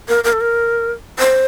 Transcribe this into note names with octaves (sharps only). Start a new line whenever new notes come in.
A#4
A#4
A4
A#4
C5